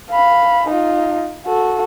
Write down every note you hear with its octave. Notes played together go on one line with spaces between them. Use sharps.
F5 B5
D#4 F4
F#4 A4